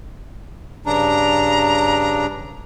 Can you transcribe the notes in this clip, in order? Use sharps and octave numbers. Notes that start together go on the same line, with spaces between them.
G2 C#3 D4 A#5